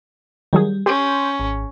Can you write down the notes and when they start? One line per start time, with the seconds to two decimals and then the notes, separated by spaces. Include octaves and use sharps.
0.53 D#3 F#3 G3 G#4
0.86 C#4 G4 C6 G6
1.40 G#1